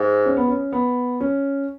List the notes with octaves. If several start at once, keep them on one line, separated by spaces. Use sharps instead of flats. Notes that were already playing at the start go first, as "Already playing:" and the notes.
Already playing: G#2
C#4
B3
C#4
B3
C#4